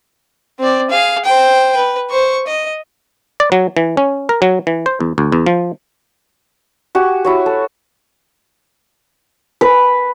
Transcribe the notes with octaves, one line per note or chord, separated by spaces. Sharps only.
C4 D5
G#4 F5
C5 G5
B4
C5 C#6
D#5
D5
F#3
E3
C#4
A#4
F#3
E3
C5
E2
D2
E2
F3
F#4 G4 G#5
E4 F#4 C#5
A4
B4